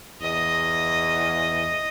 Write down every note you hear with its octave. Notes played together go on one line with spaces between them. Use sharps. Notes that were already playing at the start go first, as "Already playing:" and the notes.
E2 D#5